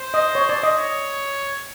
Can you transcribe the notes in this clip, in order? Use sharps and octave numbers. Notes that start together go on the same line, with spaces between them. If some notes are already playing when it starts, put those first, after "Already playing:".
Already playing: C5
D#5
C#5
D5
D#5
C#5